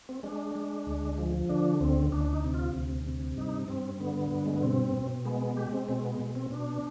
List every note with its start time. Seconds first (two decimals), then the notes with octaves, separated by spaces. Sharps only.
0.09 C4
0.23 G#3 D4
0.55 G#3
0.86 D2
1.18 F3
1.49 D3 D4
1.80 D2 C4
2.12 D2 D4
2.25 D4
2.33 D#4
2.44 C3
2.54 F4
2.75 D2
3.06 C3
3.37 G2 D#4
3.68 G2 C4
4.00 D3 B3
4.31 G2
4.46 G#3
4.54 B3
4.63 B2 C4
4.94 B2
5.25 G#3 B3
5.41 B3
5.57 G#3 G4
5.73 C4
5.89 B2 C4
6.03 B3
6.19 B2 G#3
6.35 C4
6.50 B2 D4